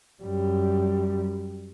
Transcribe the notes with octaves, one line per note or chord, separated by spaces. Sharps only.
F#2 G3